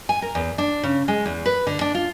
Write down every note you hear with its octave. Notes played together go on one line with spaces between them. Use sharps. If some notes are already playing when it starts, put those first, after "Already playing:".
G#5
A#4
E2
D4
C#3
G#3
E2
B4
D3
D4
F4